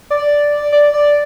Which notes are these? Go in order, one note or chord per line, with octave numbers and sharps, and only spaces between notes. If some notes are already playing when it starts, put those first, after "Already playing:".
D5
D5
D5